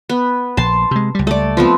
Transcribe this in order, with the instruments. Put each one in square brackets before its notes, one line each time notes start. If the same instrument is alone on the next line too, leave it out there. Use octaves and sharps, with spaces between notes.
[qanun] B3
[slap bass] A#1 [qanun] A5 C6
[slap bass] C3 G#3
C#2 G3
[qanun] A3 D5
F3 B3 C4